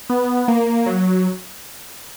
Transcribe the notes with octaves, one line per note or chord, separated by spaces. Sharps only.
B3
A#3
F#3